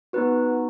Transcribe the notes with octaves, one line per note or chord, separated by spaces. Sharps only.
B3 D#4 F#4 B4